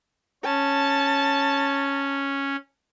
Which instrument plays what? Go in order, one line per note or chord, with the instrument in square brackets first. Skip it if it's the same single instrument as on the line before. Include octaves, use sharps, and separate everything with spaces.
[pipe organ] C#4 [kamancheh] A5